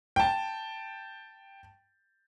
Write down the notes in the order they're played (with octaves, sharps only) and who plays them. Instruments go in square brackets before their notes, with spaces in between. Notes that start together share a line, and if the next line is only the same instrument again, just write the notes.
[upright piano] G5 A5